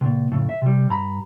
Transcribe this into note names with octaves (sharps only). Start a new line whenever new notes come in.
C#2 A#2
F2 A2 C#3
E5
C3 G3
G2 A#5 B5